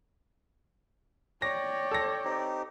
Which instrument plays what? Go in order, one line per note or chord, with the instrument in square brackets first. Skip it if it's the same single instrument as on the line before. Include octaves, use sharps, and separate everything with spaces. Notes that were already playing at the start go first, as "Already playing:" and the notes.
[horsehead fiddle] C#5 [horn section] D5 G5 [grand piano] A#6
[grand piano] A4 A#6
[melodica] C4 D#4 G4